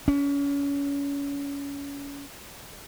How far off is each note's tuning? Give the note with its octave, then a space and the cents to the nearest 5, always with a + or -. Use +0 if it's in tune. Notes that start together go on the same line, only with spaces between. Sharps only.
C#4 +30